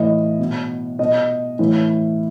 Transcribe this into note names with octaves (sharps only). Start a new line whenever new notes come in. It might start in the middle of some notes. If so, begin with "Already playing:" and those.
Already playing: A2 E3 D#5
B2
B2 D#5
A2 E3